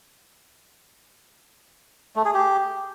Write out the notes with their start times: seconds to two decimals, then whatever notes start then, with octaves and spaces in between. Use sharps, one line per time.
2.16 A3
2.25 G#4
2.34 G4